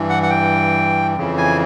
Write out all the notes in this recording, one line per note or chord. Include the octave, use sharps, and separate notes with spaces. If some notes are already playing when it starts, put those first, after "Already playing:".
Already playing: G2 E3
F#5
F#5
G5
F2 C#3 E3
G#5